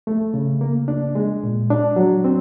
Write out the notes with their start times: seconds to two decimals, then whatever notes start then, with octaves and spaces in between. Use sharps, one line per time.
0.07 A3
0.34 C#3
0.61 A#3
0.88 D4
1.15 G#3
1.43 A#2
1.70 D4
1.96 F#3
2.24 C4